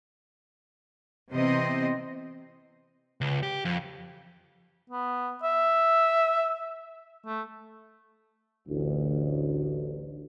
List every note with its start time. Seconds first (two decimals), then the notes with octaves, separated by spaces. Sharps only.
1.31 C3 E3 B3 C4 C5 D#5
3.21 C#2
3.43 G4
3.65 F2
4.90 B3
5.43 E5
7.26 A3
8.67 A1 D2